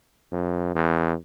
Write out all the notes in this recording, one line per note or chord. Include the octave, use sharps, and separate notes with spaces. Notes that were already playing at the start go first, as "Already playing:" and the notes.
F2
E2